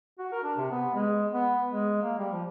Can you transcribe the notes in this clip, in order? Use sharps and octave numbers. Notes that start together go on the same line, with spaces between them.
F#4
A#4
D4
C3
B3
G#3
B3
G#3
A#3
G3
F3